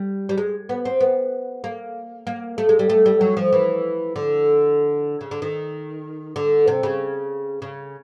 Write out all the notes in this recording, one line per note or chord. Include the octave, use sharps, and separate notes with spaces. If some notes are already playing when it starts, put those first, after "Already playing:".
Already playing: G3
G3
G#3
B3
C4
B3
A#3
A#3
A3
G#3
G3
A3
G3
F#3
F3
E3
D3
C#3
D3
D#3
D3
C3
C#3
C#3